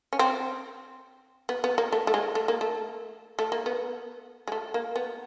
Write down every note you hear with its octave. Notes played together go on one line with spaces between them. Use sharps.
C#4
C4
B3
B3
A#3
A3
A3
G#3
A3
A#3
A3
A3
A#3
B3
G#3
A3
A#3
B3